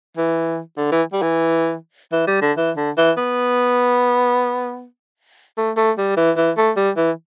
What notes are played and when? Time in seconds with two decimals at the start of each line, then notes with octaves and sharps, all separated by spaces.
0.17 E3
0.77 D3
0.92 E3
1.13 G3
1.22 E3
2.12 E3
2.27 G3
2.42 D3
2.57 E3
2.77 D3
2.97 E3
3.18 B3
5.58 A3
5.77 A3
5.98 G3
6.17 E3
6.37 E3
6.58 A3
6.77 G3
6.97 E3